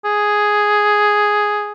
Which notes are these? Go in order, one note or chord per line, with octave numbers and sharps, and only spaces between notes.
G#4